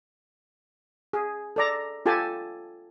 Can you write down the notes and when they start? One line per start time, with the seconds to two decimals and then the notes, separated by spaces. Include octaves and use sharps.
1.13 G#4
1.56 A4 D5 A#5
2.06 F4 G4 A4 G#5 A5